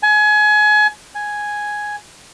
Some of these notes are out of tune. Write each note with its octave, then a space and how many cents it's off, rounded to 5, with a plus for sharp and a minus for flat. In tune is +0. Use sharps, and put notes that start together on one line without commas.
G#5 +30
G#5 +0